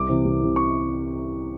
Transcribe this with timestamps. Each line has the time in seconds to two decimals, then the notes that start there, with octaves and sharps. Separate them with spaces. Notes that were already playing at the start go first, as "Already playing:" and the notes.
Already playing: C2 D6
0.09 C3 E3
0.25 C2
0.41 C3 E3
0.56 C#6